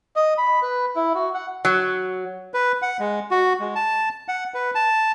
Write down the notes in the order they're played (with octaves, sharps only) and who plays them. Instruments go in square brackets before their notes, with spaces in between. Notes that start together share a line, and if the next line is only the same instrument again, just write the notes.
[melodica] D#5
B5
B4
E4
F#4
F#5
[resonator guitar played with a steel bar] F#3
[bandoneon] B4
F#5
G#3
F#4
G#3
A5
F#5
B4
A5